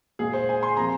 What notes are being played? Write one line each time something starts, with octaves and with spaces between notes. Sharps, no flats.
A#2 G#3 G#4
C5
G#5
C6
C3 F3 A#3 A#5